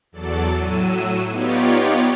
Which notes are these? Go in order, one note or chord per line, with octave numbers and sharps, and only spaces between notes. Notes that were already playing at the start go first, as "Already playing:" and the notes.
E2 F#3 A4 D5 A6
A2 F#3 E6 D#7
B3 D#4 F4 G4 C#5 D5